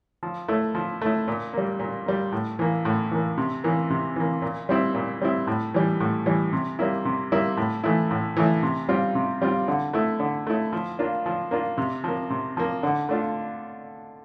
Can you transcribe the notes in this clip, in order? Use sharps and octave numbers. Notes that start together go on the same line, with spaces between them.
F3
A3 E4
F3
A3 E4
A#2
G3 A#3
A#2
G3 A#3
A2
E3 A#3
A2
E3 A#3
C3
E3 A#3
C3
E3 A#3
A#2
G3 C4 E4
A#2
G3 C4 E4
A2
E3 G3
A2
E3 G3
C3
G3 A#3 E4
C3
G3 A#3 E4
A2
E3 A3 E4
A2
E3 A3 E4
C3
G3 C4 F4
C3
G3 C4 F4
D3
A3 E4
D3
A3 E4
F3
A#3 D4 F4
F3
A#3 D4 F4
C3
F3 A#3
C3
F3 A#3
D3
A3 D4 F4